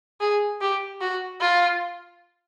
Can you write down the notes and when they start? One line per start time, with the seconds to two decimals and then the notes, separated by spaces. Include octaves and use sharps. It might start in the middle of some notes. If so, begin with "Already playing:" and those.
0.21 G#4
0.61 G4
1.01 F#4
1.41 F4